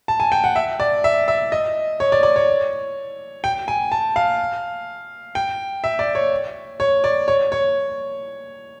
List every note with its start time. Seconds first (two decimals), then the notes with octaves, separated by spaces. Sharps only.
0.08 A5
0.20 G#5
0.32 G5
0.44 F#5
0.56 E5
0.80 D5
1.04 E5
1.28 E5
1.52 D#5
2.00 C#5
2.12 D5
2.23 D5
2.36 C#5
3.44 G5
3.68 G#5
3.92 A5
4.16 F5
5.35 G5
5.84 E5
5.99 D5
6.15 C#5
6.80 C#5
7.04 D5
7.28 C#5
7.52 C#5